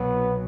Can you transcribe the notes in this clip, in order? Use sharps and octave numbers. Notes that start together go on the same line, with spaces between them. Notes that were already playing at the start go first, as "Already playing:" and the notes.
Already playing: C2 B2 F#3 B3